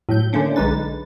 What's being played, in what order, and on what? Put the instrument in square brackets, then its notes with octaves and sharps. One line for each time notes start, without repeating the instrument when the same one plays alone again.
[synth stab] A2 F#3 G6
D3 A3 A#3 C#4 D4
B1 D3 G#3 D#4 B4 A6